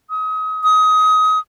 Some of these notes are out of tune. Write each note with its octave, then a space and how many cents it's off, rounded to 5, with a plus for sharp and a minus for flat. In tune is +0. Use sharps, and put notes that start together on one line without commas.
D#6 +35
D#6 +20